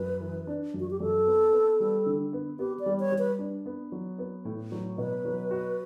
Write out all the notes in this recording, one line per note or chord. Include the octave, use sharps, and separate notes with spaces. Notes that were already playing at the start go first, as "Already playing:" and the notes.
Already playing: F#2 B4
E3
D4
F#2
F#4
G4
F#2 A4
B3
B3
G3
D3
B3
B3 G4
D5
G3
C#5
G3
B4
D4
B3
F#3
B3
A2
F#3
B2 B4
F#3
F#4